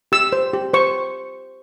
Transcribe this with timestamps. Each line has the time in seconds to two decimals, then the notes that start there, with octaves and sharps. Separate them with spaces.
0.12 G4 E6
0.33 C5
0.53 G4
0.74 C5 C#6